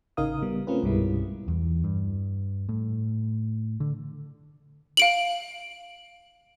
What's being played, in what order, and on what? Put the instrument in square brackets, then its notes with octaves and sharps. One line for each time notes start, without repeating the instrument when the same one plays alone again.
[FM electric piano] A1 C#3 D#4 A#4 F5 D#6
G3 B3
A3 C4 C#4 F4 A#4 B4
C2 G2 B2 G3 G#3 E4
[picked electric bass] E2
G2
A2
D3
[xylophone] F5 D7 F#7